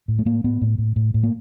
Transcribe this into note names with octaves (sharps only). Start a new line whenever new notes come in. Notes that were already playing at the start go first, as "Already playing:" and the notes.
A2
A3
A2 A#3
A2 B3
A2
A2
A2
A2
A#3